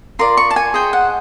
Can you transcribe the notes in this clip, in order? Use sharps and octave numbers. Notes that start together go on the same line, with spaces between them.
F4 A#4 D5 C6
C#6
A5
G#5
G#4 C5 D#5 G5
F#5